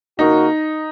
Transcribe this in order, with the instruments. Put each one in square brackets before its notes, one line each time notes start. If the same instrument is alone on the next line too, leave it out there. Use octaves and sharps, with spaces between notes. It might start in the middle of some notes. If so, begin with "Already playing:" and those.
[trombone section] C#3 A#3 F#4 A#4 [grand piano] D#4